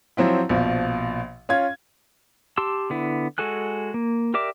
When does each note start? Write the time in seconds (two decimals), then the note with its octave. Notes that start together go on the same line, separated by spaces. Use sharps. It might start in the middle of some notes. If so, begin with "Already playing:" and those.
0.17 F3 F#3 C4 E4
0.49 A#1 B2 F3
1.49 C#4 F4 G#6
2.57 G4 A5 C6 E6
2.90 D3 B3 E4
3.38 G#3 F#4 A4 G#5 F#6
3.94 A#3
4.34 G4 A#4 D5 E5 D6